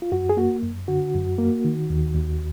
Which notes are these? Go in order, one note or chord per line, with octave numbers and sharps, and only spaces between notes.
F4
F#2 F#4
G#4
A#3 F#4
F#2
D3 F#4
F#2
A#3
D#3
D#2
D#2